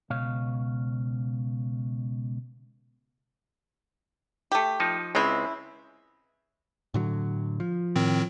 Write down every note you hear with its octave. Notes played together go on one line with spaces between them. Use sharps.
C#2 B2 C#5 F5
A3 G4
F3 D#4
C#2 G#3 C4 C#4 E4
A2 D3 F#3
F3
A2 D#3 C4